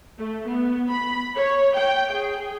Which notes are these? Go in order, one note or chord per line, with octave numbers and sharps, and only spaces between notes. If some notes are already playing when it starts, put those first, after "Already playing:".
A3
B3
B5
C#5
G5
G#4